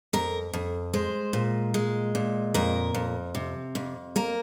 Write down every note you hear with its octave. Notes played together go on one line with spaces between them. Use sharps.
F2 A#4
F2
G#3 C5
A#2
G#3
A#2
F2 A#4
F2
C3
F2
A#3 A#4